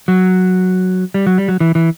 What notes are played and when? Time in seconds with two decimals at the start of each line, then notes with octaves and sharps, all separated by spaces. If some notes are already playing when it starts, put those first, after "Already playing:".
0.08 F#3
1.14 G3
1.27 F#3
1.38 G3
1.48 F#3
1.60 E3
1.75 E3